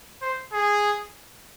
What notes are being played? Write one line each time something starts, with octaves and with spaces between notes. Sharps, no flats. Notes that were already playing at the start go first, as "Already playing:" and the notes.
C5
G#4